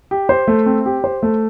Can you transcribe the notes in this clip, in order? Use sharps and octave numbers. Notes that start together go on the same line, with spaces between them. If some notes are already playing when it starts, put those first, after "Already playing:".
G4
C5
A3
C4
G4
C5
A3